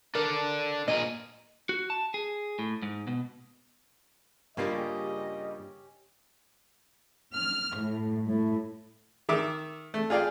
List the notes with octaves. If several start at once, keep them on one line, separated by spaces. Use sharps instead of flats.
D4 A4 A#4 D5
A#2 G#4 A#4 D#5
F#4
A5
G#4
A2
G#2
B2
G2 C#3 G3 A#3 C#4 F4 G4 D#5
F6
A2
A2
D#3 E5 D6
A3
F4 G#4 D5 F5 G5